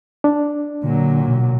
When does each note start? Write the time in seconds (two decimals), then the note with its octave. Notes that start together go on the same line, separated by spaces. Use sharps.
0.24 D4
0.84 A#2 D3 F#3
1.28 B2